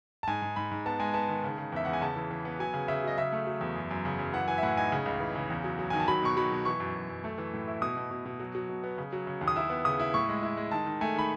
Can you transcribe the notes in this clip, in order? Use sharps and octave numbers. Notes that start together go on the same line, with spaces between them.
A5
G#2 G#5
G#2
G#2 B5
G#2
B3 A5
G#3 G#5
B3 A5
D#3
C#3
C#3
E2 E5
E2 F#5
G#5
C#3 A5
E3
E3
B3
F#3 G#5
C#3
C#3 E5
F#3 D#5
C#3 E5
A3
F#3
E2
F#2
F#2
C#3
F#2
E3 F#5
E3 G#5
E5
A2 F#5
D#4 G#5
C#3
C#2
E3
C#3
E2
F#3
F#3
D#3 G#5
A5
F#3 B5
B2 C#6
F#3 B5
B2
E3 C#6
F#2
F#2
F#2
A3
E3
A2
E4
B2 D#6
B2
B2
B2
F#3
F#3
B2
B3
C#3
F#3
C#3
D#2
D#6
E4 E6
B3
C#3 D#6
E4
A2 C#6
G#3
E4
G#3
D#3 A5
D#3
A3 G#5
D#3 B5